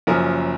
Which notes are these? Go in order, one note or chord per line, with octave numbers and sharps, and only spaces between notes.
F#1 F#2 F3 A#4